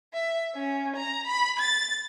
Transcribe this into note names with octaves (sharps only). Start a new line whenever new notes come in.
E5
C#4
A#5
B5
A6